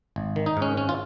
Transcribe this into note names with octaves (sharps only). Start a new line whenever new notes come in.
G#1
D#3
D#4
G#2
C#4
G#1 C#4
F4